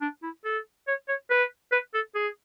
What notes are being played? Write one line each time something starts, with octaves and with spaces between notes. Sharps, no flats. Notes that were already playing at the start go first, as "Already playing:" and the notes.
D4
E4
A4
C#5
C#5
B4
B4
A4
G#4